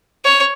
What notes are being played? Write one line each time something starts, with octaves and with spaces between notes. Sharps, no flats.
C#5